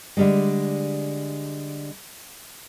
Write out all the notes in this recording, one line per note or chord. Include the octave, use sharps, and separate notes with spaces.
D3 G3 G#3